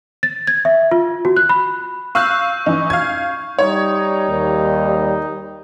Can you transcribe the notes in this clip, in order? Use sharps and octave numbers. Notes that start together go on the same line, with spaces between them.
A6
G#6
E5
F4
F#4
F#6
B5
F5 C#6 E6 F#6 G6
E3 C#4 D#4
F5 G#6
G3 D#4 C#5
D#2